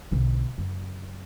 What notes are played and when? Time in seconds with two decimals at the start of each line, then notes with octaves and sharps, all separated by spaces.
0.11 B1 D3
0.58 F#2 C#3